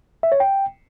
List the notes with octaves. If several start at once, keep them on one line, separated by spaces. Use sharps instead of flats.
E5
C#5
G5